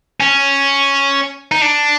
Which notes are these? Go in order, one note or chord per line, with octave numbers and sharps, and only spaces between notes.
C#4
D#4
D4